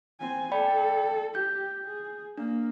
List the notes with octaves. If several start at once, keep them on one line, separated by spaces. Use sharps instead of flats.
C4 G#5
A4 D5 G5 B5
G4 G6
G#4
A#3 D4